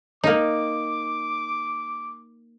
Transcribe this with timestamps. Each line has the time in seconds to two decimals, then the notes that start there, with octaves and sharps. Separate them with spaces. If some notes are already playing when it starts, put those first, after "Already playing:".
0.24 A#3 D#4 D6